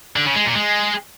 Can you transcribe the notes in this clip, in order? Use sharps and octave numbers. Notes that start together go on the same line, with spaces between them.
D3
C#3
G#3
A#2
G#3